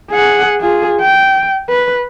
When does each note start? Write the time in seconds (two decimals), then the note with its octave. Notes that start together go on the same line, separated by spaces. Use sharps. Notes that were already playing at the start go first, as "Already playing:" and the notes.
0.11 G#4 F#5
0.61 F4 G#4
1.00 G5
1.69 B4